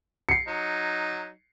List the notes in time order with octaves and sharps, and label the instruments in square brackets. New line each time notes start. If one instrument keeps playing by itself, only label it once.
[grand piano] C7 C#7
[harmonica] F#3 D#4